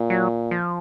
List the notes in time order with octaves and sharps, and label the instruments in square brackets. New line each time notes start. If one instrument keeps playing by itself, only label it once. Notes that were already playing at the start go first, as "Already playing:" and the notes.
Already playing: [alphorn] A#2
[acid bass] F#3
F3